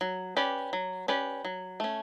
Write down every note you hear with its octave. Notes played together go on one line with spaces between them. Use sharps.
F#3
C#4 G4 B4 D5
F#3
C#4 G4 B4 D5
F#3
A3 C#4